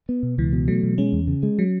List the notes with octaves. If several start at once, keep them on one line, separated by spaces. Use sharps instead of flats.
B3
B2
C#2 E3
B2
F#3 A3
B2
G#3 C#4
E2
C#3
G#3
F#3